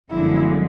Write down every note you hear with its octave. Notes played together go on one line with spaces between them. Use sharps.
G1 F#2 D3 F3 G#3 E4